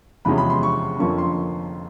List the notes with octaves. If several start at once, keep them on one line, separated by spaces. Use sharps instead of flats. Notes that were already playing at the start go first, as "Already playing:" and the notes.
E2 C3 F3 G#3 C#4 B5
B5
C6
C#6
F2 D3 F3 A#3 C#4 C#6
C6